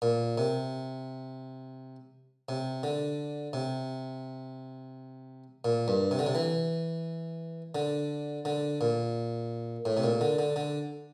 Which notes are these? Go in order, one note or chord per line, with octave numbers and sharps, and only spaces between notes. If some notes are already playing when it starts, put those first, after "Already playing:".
A#2
C3
C3
D3
C3
A#2
G2
C3
D3
C3
E3
D3
D3
A#2
A2
C3
A#2
D3
D3
D3